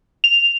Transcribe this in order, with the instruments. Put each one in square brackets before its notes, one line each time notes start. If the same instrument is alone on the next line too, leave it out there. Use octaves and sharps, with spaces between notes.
[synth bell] F7